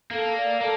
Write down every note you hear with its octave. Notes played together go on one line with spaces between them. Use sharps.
A#3 A4
D5 F5
A#3 A4